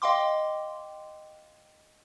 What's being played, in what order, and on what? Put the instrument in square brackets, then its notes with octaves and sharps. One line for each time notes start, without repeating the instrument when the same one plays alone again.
[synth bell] D#5 F5 G5 C6 D6